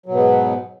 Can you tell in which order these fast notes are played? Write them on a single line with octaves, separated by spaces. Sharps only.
F#3 B2 G#2 B3